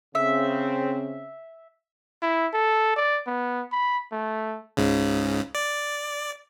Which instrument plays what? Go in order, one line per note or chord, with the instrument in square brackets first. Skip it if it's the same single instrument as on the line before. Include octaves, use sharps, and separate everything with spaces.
[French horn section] C#3 C4 [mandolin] E5
[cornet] E4
A4
D5
B3
B5
A3
[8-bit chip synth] C#2 G#2 C#3
D5